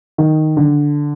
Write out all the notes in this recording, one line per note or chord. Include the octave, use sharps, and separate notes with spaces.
D#3
D3